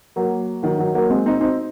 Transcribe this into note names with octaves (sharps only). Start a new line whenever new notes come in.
F#3 A#3
D#3 F#3
D#3 F#3
F#3 A#3
G#3 C4
C4 D#4
C4 D#4